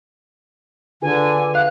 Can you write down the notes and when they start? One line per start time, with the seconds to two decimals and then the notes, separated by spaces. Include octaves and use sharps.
1.02 D3 F4 G#4 B4 G#5
1.55 F5 F#6